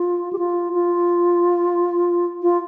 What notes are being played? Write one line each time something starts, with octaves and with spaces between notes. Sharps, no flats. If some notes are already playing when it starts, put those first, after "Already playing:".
Already playing: F4
G4
F4
F4
F4